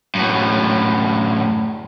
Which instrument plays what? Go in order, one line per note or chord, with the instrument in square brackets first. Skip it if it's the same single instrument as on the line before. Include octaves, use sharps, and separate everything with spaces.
[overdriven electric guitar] F#2 A2